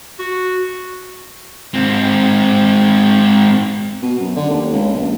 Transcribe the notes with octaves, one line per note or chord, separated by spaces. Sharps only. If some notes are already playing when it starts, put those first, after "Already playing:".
F#4
G#2 C4
B2
F#2
D3
D#2
C#2
A#1